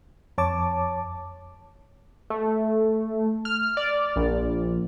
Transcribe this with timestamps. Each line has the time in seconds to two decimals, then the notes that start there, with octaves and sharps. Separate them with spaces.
0.38 F2 C#5 A5 D6
2.30 A3
3.45 F6
3.77 D5
4.16 A#1